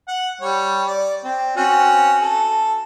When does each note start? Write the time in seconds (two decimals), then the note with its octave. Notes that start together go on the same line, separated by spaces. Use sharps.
0.08 F#5
0.41 G3 C#5
0.87 D5
1.24 C4
1.57 C4 C#4 F#4
2.22 A4